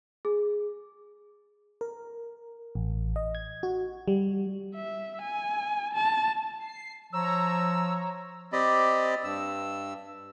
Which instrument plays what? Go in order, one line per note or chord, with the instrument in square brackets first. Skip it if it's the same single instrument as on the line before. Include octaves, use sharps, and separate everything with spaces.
[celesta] G#4
[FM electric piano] A#4
A1
D#5
G#6
F#4
G3
[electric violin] E5
G#5
A5
[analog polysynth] C7
[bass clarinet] F3 [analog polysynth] C#5 A#5 [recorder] E6
[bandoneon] C4 G4 D5 D#5 B5
G2 E6